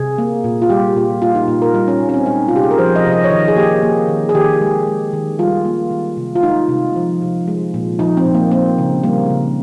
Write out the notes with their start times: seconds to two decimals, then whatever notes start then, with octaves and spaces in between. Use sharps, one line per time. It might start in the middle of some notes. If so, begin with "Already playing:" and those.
Already playing: C3 G#4
0.18 A#3
0.44 A#2
0.62 F4
0.70 G3 G4
0.96 A#2
1.22 A#3 F4
1.35 D#4
1.48 A#2
1.62 A#4
1.74 G3 D#4
1.88 C#4
2.00 A#2
2.09 C#4
2.14 C4
2.26 G#3 D#4
2.48 F4
2.53 C3 G4
2.63 G#4
2.71 A#4
2.79 F3 C5
2.96 D#5
3.04 C3
3.13 D#5
3.24 C#5
3.30 D#3 D#5
3.48 G#4
3.56 A#3 G4
3.82 A#3
4.08 D#3
4.29 G#4
4.35 D#3 G4
4.61 G#3
4.87 G#3
5.13 D#3
5.39 G3 F4
5.65 A#3
5.91 D#3
6.17 C3
6.35 F4
6.43 G#3 D#4
6.69 C3
6.96 F3
7.22 C3
7.48 G#3
7.74 A#2
7.99 F3 D#4
8.17 C4
8.25 A#2
8.34 A#3
8.51 A#3 C4
8.78 C#3
9.03 G3 A#3
9.30 C#3